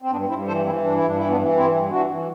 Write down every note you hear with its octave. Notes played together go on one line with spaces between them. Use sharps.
C4
G2 B3 D4
G2 C4 E4
E3 A4 C5
E3 C4 E4
G2 D4
E4
G2 D4
E3 E4
B3 D4
E3
G2 C4 E4
G2
E3 D4 F#4
E3